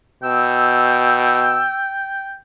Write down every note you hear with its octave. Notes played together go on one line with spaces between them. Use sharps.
B2 G5 E6